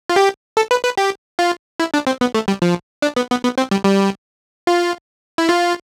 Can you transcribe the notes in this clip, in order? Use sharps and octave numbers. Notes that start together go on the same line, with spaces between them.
F4
G4
A4
B4
B4
G4
F4
E4
D4
C4
B3
A3
G3
F3
D4
B3
B3
B3
C4
G3
G3
F4
E4
F4